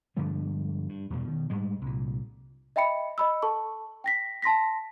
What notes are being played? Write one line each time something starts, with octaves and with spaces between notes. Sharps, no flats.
G2 D3 F3 G#3
G2
E2 G2 B2
B2 D#3
G#2 G3 G#3
C2 A#2
D#5 E5 G5 B5 C#7
D#5 B5 E6
A4 A5 C#6
G5 A#6 B6
A5 C6 A#6 B6